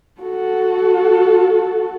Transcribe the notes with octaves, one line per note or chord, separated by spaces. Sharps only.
F#4 A4